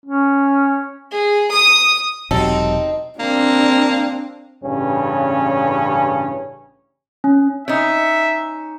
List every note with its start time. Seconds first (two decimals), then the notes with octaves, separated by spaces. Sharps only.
0.06 C#4
1.11 G#4
1.51 D#6
2.31 E1 C3 F#3 C4 D#4 A4
3.19 A#3 C4 D4
4.63 A1 G2 C#3 C#4
7.24 C#4
7.68 C#4 D#4 E5